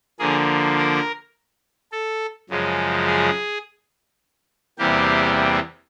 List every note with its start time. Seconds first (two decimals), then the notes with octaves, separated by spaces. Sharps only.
0.19 D3 F3 A#3 G#4
0.78 A#4
1.92 A4
2.49 F#2 C#3 F3 G#3
3.06 G#4
4.78 E2 C3 E3 G3 A#3 G4